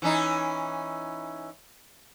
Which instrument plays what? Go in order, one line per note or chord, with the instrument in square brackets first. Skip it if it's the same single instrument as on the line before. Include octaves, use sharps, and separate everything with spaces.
[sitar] E3 C#4 D#4